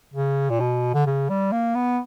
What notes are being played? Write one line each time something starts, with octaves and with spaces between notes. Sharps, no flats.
C#3
A#2
B2
D3
C#3
G3
A#3
B3